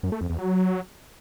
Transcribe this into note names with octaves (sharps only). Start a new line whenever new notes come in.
F#2
A3
F2
E2
F#3